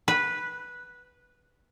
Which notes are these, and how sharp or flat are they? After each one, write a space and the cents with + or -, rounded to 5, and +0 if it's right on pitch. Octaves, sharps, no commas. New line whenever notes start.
B4 -10